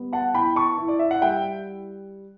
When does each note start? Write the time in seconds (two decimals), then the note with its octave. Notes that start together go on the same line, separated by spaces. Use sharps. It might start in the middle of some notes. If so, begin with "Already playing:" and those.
Already playing: G3 B3
0.13 F#5 A5
0.34 E4 G5 B5
0.56 A5 C#6
0.78 E4
0.88 D5
0.99 E5
1.11 F#5
1.22 G3 E5 G5